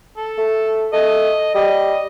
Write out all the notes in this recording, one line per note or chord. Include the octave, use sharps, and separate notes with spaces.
A4
A3
A3 D#5
G3 D#5